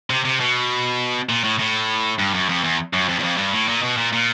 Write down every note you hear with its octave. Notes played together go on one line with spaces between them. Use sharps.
C3
C3
B2
A#2
A2
A2
G2
F#2
F2
E2
F#2
F2
E2
F2
G2
A2
A#2
B2
A#2
A#2